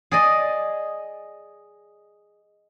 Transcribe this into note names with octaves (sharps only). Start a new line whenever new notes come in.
G#4 D5 D#5